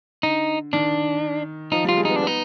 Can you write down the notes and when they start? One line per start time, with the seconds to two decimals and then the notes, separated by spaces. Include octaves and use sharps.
0.23 D3 D#4
0.73 D#3 D4
1.71 F3 D#4
1.84 G3 F4
1.97 G#3
2.05 B3 D#4
2.16 D4
2.22 B3
2.27 D#4